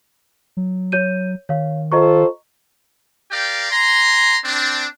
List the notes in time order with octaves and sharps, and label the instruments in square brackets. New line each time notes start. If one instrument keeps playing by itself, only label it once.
[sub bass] F#3
[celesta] C#5 G6 D#7
[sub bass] D#3 [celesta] C#5 F5
[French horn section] F4 A4 C5 [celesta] D#5 A#5 C#6
[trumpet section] G4 A#4 D5 F5 G5
G#5 A#5 C6
C4 D4